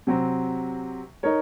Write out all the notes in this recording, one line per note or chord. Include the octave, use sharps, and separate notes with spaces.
C3 F#3 C4
D#4 A#4 C#5